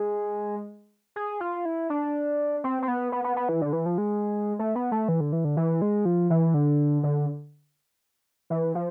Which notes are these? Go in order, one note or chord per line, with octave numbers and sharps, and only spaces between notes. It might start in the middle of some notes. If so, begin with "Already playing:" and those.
Already playing: G#3
G#4
F4
E4
D4
C4
C4
B3
B3
B3
B3
E3
D3
E3
F3
G#3
A3
B3
A3
E3
D3
E3
D3
E3
G#3
F3
E3
D3
D3
E3
F3